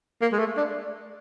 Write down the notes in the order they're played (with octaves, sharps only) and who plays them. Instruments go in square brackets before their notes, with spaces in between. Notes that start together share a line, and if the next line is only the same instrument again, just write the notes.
[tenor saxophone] A#3
G#3
A3
D4